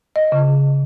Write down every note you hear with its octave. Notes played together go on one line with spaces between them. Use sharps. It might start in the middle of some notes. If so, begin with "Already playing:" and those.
D#5
C#3